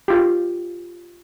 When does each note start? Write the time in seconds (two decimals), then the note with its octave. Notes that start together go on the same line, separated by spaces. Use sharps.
0.08 F4 G4